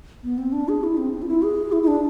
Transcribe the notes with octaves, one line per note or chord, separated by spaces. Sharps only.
B3
C4
D4
G#4
E4
C4
C4
F4
E4
G#4
E4
E4
D4